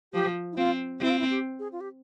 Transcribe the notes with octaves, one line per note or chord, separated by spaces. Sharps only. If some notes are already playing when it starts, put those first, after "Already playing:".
F3 G4
E4
C4 F4
C4 E4
F4
E4
G4
G#4
F4
G4